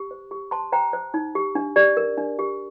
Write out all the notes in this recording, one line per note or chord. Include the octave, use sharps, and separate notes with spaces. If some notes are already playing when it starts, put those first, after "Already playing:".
Already playing: G4
C5
G4
C5 A5 C6
C5 G5 A#5
C5
D#4
G4
D4
G4 D5
A#4
D4
G4